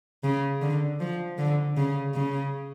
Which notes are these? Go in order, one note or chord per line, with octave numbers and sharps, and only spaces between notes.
C#3
D3
F3
D3
C#3
C#3